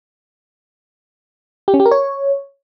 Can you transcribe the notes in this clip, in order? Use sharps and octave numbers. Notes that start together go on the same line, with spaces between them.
G4
C#4
G4
A#4
C#5